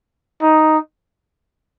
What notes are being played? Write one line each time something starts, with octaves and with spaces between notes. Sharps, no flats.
D#4